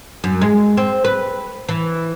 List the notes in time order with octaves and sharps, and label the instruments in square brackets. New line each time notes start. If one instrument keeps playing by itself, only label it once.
[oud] F#2
G#3
C4
B4
E3